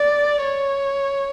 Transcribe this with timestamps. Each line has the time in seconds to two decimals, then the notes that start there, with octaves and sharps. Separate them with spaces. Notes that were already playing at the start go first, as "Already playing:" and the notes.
Already playing: D5
0.43 C#5